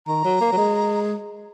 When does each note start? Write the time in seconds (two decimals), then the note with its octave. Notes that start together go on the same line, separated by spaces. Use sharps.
0.07 D#3 A#5
0.24 F#3
0.41 A#3
0.53 F#3
0.57 G#3